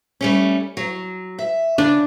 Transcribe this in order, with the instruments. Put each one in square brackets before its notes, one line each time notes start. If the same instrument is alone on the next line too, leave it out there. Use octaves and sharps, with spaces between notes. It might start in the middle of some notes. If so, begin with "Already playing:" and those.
[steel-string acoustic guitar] G3 A3 C#4
F#3
E5
[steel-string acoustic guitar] C#3 [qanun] D4